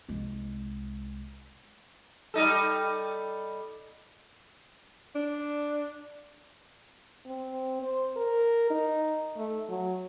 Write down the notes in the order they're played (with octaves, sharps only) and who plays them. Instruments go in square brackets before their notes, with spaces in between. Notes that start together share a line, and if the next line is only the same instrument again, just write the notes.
[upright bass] C2 G#3
[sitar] G3 D#4 A4
[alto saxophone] D4
[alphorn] C4
C5
A#4
D#4
A3
F#3